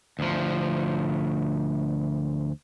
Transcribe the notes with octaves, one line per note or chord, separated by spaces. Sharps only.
D2 F3